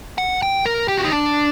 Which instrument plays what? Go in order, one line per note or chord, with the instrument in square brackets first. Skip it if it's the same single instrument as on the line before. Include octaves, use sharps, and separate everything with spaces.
[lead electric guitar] F#5
G5
A#4
G4
F#4
D#4
D4